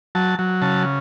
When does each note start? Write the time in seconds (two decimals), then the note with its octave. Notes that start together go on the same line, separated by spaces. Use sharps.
0.15 F#3 A5
0.39 F#3
0.62 C#3 A5